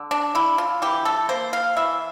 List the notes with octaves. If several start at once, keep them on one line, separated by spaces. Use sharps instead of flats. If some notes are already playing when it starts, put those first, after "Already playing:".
Already playing: D3
D4
D3 E4
F4
E3 G4
A4
A#3 C5
F5
E3 E5